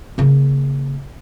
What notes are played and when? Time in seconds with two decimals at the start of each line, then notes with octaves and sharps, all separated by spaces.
0.18 C#3 A#3